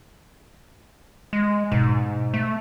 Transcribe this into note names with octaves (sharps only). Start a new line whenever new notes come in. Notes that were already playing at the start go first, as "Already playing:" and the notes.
G#3
G#2 B2 G#3
A3